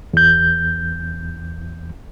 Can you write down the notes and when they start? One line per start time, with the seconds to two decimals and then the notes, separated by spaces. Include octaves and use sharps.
0.14 E2 G6